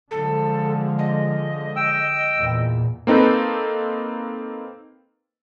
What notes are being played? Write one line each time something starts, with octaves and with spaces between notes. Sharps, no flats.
D3 F3 G#3 A4
D#5
G5 E6
E2 A#2
A#3 C4 D#4 A4 B4